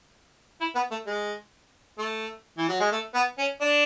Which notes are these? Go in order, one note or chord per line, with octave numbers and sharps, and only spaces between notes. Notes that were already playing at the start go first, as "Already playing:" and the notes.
E4
B3
A3
G#3
A3
E3
F#3
G#3
A3
B3
C#4
D4